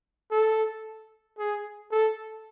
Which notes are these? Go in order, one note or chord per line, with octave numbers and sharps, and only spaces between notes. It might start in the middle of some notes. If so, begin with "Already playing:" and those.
A4
G#4
A4